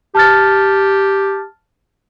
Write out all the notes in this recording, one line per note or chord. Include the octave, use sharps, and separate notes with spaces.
G4 A5 F6 A6